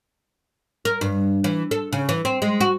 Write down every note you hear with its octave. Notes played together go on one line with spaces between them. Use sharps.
A#4
G2
E3
A4
C#3
E3
C4
G#3
F#4